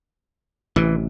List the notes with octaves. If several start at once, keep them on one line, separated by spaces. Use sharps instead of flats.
A1 C3 E3